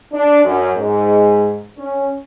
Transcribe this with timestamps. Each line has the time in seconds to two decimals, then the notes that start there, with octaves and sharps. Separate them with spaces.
0.12 D4
0.45 F#2
0.75 G#2
1.78 C#4